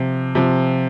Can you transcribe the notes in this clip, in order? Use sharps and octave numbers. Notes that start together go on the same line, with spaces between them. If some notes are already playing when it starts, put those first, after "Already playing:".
Already playing: C3 F3
C3 F3